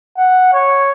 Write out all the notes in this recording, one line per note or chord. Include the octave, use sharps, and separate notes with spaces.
F#5
C#5